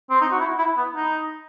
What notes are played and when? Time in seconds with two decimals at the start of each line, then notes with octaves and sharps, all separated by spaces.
0.10 C4
0.21 D#4
0.32 F#4
0.40 E4
0.58 E4
0.77 B3
0.96 D#4